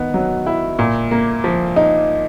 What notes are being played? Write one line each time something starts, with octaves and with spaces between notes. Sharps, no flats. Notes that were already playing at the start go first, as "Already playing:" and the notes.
Already playing: D#3 B3
F#3
E4
A#2
A#3
F3
D#4